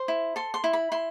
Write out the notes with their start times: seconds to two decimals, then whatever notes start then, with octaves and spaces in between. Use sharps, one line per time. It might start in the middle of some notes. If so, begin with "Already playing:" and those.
Already playing: C5 C6
0.08 E4
0.36 A4 C6
0.54 C6
0.64 E4
0.73 B5
0.92 E4 C6